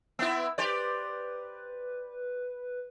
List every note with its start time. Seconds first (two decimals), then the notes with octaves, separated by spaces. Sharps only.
0.19 B3 C4 E4 E6
0.58 G4 B4 C5 D5